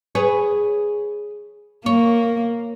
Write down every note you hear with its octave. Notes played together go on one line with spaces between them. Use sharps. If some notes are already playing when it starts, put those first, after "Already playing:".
G#4 B4 C#5
A#3 C#5